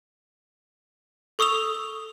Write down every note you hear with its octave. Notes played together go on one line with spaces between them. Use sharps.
A4 C#6 D#6 E6 F7